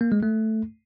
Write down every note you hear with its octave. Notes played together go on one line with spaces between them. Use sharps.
A#3
G#3
A3